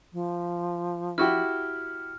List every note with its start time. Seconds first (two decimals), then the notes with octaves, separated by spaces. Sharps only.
0.13 F3
1.18 E4 F#4 G4 F6